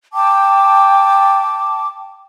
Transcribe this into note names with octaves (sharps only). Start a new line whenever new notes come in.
G5 A5 D6